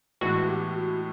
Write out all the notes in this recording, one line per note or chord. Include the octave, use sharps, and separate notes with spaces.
A2 E3 G#3 B3 E4 F#4
G4
F#4